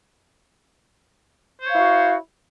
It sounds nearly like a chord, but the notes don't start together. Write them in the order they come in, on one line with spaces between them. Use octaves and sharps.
C5 C#5 F5 E4 F#4